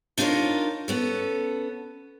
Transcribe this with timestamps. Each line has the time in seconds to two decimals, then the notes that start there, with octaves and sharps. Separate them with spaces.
0.18 D4 D#4 F4 G4 A#4 C#5
0.88 B3 C#4 A4